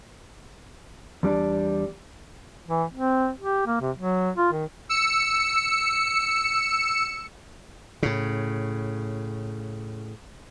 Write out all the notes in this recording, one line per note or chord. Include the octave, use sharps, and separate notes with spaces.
E2 G3 D4 D5
E3
C4
G4
A#3
C3
F#3
F4
D#3
E6 C#7
A2 C#3